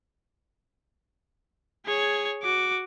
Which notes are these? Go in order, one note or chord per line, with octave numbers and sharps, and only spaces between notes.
G#4 C#5
F#4 D6